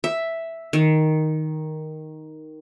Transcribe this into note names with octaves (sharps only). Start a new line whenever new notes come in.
E5
D#3